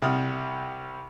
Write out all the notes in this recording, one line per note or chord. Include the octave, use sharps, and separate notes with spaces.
C2 C3 G3 F#5 D#6 F6